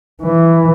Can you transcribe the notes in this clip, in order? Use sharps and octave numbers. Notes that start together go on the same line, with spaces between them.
E3